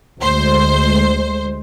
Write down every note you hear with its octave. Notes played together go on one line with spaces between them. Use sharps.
D2 G#3 C5